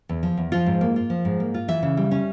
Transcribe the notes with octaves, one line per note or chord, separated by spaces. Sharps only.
E2
F3
E2
F3 F4
G#2
A#3
F4
F3
G#2
A#3
F4
E3 E5
C#3
G3
C#4